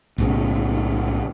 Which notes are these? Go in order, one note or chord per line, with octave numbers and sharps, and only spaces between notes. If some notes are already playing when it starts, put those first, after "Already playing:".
B1 A2 C#3